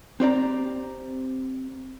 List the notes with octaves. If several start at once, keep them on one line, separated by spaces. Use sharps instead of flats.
C4 G4 D5 A#5